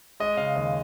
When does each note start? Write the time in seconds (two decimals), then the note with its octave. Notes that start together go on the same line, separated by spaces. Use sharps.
0.20 G#3 D#5
0.37 C#3 F5
0.56 D#2 D#5